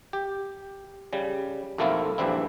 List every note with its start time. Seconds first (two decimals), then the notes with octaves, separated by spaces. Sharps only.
0.13 G4
1.13 C#3 G3
1.78 B1 F2 A3 A#3 E4 F4
2.18 A#1 E2 G2 D3 C4 E4